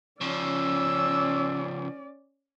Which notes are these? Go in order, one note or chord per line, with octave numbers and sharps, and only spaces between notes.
C#3 F3 C#4 D5 E6